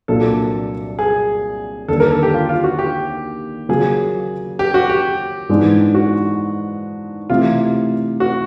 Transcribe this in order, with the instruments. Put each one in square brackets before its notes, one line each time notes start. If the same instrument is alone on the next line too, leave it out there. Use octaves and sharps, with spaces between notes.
[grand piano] C2 A#2 F#3 A#3 D4 [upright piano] A4
[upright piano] G#4
[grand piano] D#2 D3 G3 [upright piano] A4
[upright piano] A#4
A4
G4
F4
F4
F#4
G4
[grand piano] C#3 F#3 A#3 C#4 F4 [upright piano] G#4
[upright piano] G4
F#4
G4
[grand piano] G#2 E3 G#3 B3 D4
[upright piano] F#4
[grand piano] C3 E3 A3 [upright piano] F4
[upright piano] F#4